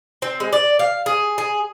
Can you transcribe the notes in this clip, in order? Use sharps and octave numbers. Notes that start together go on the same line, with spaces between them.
C4
G#3
D5
F5
G#4
G#4